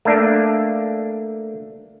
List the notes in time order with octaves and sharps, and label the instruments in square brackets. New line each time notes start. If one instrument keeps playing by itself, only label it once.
[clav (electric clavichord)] A3 A#3 D4